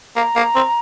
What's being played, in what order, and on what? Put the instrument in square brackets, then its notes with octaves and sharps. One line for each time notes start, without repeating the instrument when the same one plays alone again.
[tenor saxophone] A#3 [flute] A#5
[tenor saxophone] A#3
C4